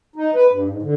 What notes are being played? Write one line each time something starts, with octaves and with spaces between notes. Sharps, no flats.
D#4
B4
G2
G#2
D3